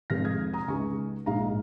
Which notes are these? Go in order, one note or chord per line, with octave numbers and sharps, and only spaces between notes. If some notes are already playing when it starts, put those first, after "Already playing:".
F1 F2 F3 G#3 F6 A#6
D#6 G#6
A#5 D#6
C#2 C#3 G#3 D#4 G#5 C#6
A#1 G#2 G#3 D#4 F5 A#5